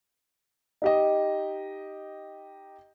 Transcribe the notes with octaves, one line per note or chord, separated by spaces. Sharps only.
D#4 G4 D#5